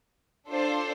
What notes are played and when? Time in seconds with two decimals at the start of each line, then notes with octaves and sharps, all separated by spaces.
0.48 D4 F4 A4 C5